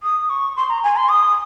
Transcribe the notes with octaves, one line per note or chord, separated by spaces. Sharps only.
D#6
C#6
C6
A#5
G#5
C6
D#6